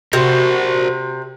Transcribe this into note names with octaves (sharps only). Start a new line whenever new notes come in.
C3 F#4 A#4 C5